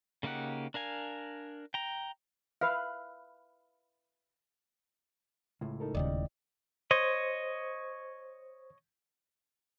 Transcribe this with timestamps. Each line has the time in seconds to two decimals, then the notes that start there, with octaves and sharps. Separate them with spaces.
0.23 C#3 A#3 D#4 G4 F#5
0.74 D4 A#4 F5 G#5
1.74 G5 A#5
2.61 B4 E5 F5
5.61 C#2 A2
5.80 D#4 A4 A#4
5.95 D#1 D#2 C#3 D5 D#5 G5
6.91 C5 C#5 D#5